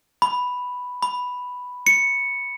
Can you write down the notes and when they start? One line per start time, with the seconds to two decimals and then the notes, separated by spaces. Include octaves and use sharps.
0.22 B5
1.02 B5
1.87 C#7